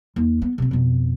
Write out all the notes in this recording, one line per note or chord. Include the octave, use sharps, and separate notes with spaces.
D#2
B3
C3 C4
F2 B2